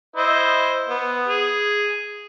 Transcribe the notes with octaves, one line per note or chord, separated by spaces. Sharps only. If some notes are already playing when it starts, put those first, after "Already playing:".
E4 C5 D#5
B3
G#4